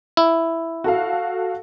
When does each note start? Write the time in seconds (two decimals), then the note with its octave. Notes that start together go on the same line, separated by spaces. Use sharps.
0.17 E4
0.84 F#4 A4 F5